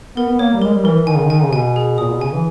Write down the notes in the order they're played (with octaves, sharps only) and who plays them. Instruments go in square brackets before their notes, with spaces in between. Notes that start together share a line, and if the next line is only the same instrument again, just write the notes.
[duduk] B3 [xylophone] A#4
[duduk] B3
[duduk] A#3 [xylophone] C#5
[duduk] G3
[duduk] G#3 [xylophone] A#4
[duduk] G3
[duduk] E3 [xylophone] A#4
[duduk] E3
[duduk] D#3 [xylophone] G#5
[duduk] C#3
D#3
[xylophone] G#5
[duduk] C#3
[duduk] B2 [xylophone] G#5
[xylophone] G#4
[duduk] A#2 [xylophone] D#6
[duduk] B2
[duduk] C#3 [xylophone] G#5
[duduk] E3